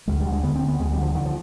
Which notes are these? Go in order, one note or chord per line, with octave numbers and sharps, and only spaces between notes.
D2 G#3
G3
D3
G#3
D3 B3
C4
D2
B3
D2 G#3
G3
D3
F3
D3 D#3
F3